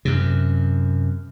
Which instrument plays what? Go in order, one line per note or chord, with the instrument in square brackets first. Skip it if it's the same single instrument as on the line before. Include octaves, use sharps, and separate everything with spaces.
[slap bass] F#2 C3